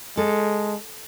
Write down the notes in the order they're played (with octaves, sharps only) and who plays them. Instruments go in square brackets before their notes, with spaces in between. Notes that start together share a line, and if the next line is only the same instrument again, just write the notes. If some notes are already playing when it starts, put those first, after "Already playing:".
[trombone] G#3 [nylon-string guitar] A4